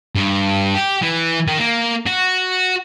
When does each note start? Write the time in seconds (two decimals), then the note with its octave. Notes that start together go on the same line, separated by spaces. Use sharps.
0.15 G2
0.74 G4
1.02 E3
1.48 D#3
1.59 A#3
2.07 F#4